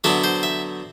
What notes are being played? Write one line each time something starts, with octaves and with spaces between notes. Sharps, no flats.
D3 F#3 B3 D4 E5
C5
E5